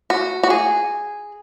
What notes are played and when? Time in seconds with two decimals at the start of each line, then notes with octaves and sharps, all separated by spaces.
0.10 F#4
0.43 F#4
0.50 G#4